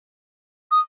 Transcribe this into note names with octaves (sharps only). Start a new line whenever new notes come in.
D#6